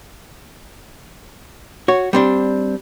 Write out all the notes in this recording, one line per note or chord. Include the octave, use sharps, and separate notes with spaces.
F#4 C#5
G3 C4 D4